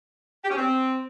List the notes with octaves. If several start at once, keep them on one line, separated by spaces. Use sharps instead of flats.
G4
C#4
C4